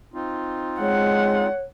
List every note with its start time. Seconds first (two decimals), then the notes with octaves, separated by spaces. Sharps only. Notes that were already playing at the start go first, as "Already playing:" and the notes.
0.14 C4 D#4 F4
0.80 G#3 C#5 F#5